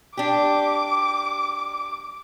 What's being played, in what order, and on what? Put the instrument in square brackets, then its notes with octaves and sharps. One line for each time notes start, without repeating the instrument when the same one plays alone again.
[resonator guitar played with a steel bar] D4 G4 [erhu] D6